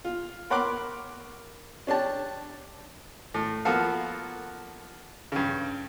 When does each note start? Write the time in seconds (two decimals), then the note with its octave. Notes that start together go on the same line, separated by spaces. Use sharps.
0.05 F4
0.50 A#4 C#5 F#5 B5 C6 D6
1.87 C#4 D4 G4 A5
3.34 A2
3.65 F3 A#3 B3 F#4 A4 F5
5.32 G2 C#3